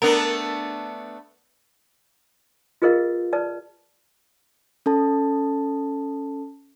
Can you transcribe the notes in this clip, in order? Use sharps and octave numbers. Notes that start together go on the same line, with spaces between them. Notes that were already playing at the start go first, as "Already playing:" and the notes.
A3 B3 D4 A#4
F4 G#4 A#4 B4 D#5 F5
B4 D5 A5
C#4 A4 A5